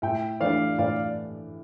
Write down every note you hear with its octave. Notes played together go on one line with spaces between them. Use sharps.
A2 E5 G5
E3 A3 D4 D5 F5
A2 D5 F5